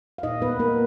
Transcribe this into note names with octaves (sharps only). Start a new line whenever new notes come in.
F5
A#2 D#4 D#5
A#2 B3 B4
A#3 B3 A#4